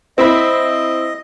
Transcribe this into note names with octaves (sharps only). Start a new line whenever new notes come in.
C4 E4 D#5 B5